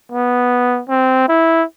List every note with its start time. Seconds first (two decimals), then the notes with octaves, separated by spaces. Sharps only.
0.12 B3
0.89 C4
1.28 E4